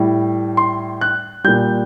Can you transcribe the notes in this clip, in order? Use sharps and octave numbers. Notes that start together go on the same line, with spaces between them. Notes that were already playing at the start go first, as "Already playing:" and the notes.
Already playing: A2 G3
C6
F#6
A#2 G3 G6